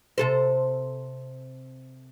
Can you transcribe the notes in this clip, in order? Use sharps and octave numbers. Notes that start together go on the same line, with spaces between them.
C3 A4 C5